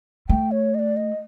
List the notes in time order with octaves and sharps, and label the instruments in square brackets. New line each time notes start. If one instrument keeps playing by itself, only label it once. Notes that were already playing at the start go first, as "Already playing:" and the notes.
[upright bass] A3 [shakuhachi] G5
[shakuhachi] C#5
D#5
D5
D#5